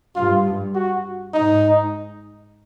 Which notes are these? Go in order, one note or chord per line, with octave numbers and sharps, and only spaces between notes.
G2 F4
F#4
G#2 D#4